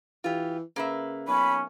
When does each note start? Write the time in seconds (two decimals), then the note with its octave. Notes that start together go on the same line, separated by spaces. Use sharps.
0.24 E3 F4 G4
0.76 C#3 A#3 B4 E5
1.28 B1 C#4 B5